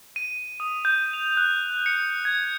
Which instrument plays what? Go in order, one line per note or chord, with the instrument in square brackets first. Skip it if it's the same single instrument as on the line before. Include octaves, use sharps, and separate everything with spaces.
[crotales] D#7
D#6
G6
F7
F#6
C#7
G#6